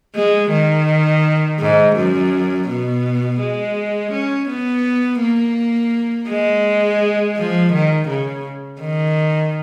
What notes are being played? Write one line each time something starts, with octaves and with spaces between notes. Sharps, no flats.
G#3
D#3
G#2
F#2
B2
G#3
C#4
B3
A#3
G#3
F3
D#3
C#3
D#3